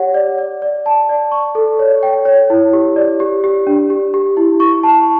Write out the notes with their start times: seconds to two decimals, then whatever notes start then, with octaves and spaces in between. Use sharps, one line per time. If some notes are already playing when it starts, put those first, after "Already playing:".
Already playing: G4 C#5 F#5
0.14 D5
0.39 D5
0.62 D5
0.86 A5
1.09 D5
1.32 C#6
1.55 A4
1.79 C#5
2.03 G5
2.25 C#5
2.50 E4
2.73 G4
2.96 D5
3.20 G4
3.44 G4
3.67 D4
3.90 G4
4.14 G4
4.37 E4
4.60 C#6
4.83 A5